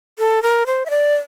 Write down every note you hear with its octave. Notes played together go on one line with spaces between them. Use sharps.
A4
A#4
C5
E5
D5